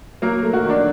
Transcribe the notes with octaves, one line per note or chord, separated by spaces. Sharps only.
F#3 A#3 A#4
A3
F#3 F#4
D#3
D4